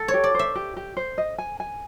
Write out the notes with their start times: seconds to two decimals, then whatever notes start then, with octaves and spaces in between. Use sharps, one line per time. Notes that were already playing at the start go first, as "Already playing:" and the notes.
Already playing: A4
0.08 C#5
0.14 G4
0.24 D5
0.35 C5 E5
0.56 G4
0.77 G4
0.97 C5
1.18 D#5
1.38 G#5
1.60 G#5